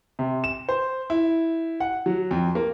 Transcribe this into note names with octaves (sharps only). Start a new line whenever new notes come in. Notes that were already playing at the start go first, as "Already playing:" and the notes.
C3
E7
C5
E4
F#5
F#3
F2
A#3